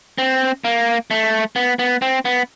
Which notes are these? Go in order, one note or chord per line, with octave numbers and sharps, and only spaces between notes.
C4
A#3
A3
B3
B3
C4
B3